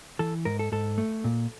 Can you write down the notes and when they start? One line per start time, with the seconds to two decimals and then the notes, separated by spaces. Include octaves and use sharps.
0.19 E3 A4
0.45 G#2 A#4
0.59 A4
0.72 G#2 A4
0.98 A3
1.24 A#2